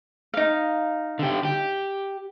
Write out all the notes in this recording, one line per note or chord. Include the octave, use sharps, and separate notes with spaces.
D#4 F5
D3 G4
G4